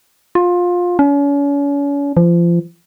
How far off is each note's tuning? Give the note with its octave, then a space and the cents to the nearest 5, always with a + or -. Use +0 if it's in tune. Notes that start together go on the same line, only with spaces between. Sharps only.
F4 +20
C#4 +40
F3 -30